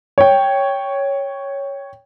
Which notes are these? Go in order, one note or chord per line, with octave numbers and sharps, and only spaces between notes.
C#5 G5